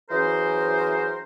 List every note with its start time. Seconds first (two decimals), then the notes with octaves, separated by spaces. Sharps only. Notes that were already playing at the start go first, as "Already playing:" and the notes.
0.11 E3 F#3 C#4 G#4 A#4 C5